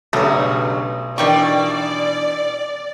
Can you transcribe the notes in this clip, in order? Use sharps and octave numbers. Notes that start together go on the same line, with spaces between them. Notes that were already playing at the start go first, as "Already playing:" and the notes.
B1 G2 C#3 F#3 A3 A#5
B2 D#3 E3 D4 G4 D5 C#6